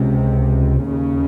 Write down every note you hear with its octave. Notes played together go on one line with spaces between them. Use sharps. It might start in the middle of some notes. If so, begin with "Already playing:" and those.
Already playing: C#2 C3
D#2 C#3